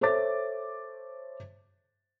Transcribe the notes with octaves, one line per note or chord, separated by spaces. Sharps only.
A4 C5 C#5 E5 D6 A6